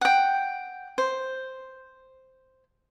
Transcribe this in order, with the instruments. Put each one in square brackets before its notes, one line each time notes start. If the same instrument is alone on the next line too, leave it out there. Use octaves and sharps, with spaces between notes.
[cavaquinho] F#5 G5
C5